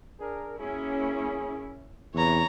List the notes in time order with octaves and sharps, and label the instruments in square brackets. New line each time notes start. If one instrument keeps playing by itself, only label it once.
[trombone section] D4 G#4 A#4
[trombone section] F#2 G#4 [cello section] A#3 C#4 E4
[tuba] E2 [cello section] C3 [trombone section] E3 [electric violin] C#5 A#5